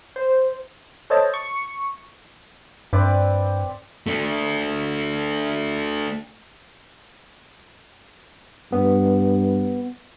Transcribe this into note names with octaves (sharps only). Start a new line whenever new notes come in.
C5
A4 C5 C#5 D#5 A5
C#6
G2 C4 B4 D5
A3 D4
G2 B3